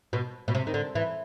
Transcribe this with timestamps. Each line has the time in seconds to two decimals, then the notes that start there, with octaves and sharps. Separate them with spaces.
0.13 B2
0.48 B2
0.55 C3
0.67 D#3
0.74 D3
0.95 E3